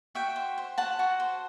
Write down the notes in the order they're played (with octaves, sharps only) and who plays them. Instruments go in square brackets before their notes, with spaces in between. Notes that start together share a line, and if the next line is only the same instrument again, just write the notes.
[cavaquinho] F#4 E5 G5
C5
C5
F#4 F#5 A5
F#4
C5